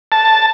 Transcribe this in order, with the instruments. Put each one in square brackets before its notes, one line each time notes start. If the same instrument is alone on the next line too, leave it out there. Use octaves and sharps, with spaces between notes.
[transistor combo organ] A5